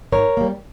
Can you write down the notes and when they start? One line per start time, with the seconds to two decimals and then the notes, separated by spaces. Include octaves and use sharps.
0.12 G#2 A#4 C#5
0.37 G3 A#3